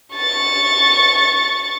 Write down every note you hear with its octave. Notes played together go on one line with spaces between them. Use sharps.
C#6 A6